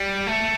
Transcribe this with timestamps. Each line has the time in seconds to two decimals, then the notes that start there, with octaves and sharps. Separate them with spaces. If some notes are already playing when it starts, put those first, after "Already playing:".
Already playing: G3
0.27 A3